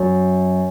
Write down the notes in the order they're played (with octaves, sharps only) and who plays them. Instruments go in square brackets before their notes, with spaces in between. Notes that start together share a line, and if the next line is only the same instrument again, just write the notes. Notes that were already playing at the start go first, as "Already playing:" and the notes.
Already playing: [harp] F#2